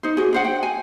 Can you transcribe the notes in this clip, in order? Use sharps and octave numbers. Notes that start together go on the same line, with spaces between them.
D#4 C5
F#4 G#4
D4 C5 F#5
G5
G#5